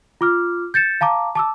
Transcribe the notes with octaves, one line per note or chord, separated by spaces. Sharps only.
F4 D6 F6
G6 A6 C#7 E7
F5 A5 A#5 D6
A5 D6 E6